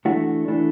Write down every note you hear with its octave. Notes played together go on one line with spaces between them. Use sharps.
E3 A3 D4 F#4
E3 A3 D4